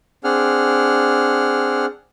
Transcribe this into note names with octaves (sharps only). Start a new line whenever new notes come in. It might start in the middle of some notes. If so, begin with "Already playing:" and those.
C4 D4 G#4 F#5 F6